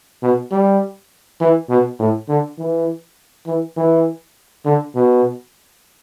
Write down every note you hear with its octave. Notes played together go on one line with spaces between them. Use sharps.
B2
G3
E3
B2
A2
D3
E3
E3
E3
D3
B2